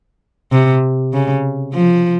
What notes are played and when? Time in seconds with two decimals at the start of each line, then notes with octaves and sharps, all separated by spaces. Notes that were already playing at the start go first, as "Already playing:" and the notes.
0.52 C3
1.13 C#3
1.74 F3